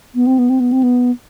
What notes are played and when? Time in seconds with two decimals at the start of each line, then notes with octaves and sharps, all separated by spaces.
0.15 B3
0.27 C4
0.39 B3
0.50 C4
0.60 B3
0.72 C4
0.83 B3